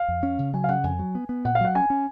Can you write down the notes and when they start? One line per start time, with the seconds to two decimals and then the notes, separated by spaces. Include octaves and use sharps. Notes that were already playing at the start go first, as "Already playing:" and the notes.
Already playing: F5
0.08 F2
0.23 C#4
0.39 C#3
0.54 F#3 G#5
0.64 F5
0.68 C#3 F#5
0.83 F2 G#5
0.99 F#3
1.15 B3
1.29 B3
1.45 A#2 F#5
1.55 F5
1.61 F#3 F#5
1.75 C#4 G#5
1.90 C#4